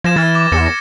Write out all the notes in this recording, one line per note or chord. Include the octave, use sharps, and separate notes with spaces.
F3 G#6 A#6 E7
E3 F6 G#6 A6
D6
E2 A#6 C#7 E7
A#6